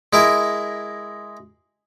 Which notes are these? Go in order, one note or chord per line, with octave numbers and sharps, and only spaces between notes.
G#3 E4 A#4